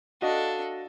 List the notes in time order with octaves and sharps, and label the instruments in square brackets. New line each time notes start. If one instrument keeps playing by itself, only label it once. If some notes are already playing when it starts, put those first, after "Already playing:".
[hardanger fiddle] D4 A4 [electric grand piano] F#4 D#5 F5